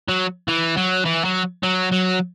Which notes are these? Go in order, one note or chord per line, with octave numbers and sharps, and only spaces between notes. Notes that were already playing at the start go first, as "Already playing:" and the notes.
F#3
E3
F#3
E3
F#3
F#3
F#3